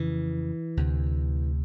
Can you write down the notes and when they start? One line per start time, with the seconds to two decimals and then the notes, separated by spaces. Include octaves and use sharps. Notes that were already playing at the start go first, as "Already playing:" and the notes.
Already playing: F2 C#3 E3
0.77 D2 C3